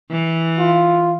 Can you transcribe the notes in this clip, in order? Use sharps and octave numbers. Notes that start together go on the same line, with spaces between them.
E3
F4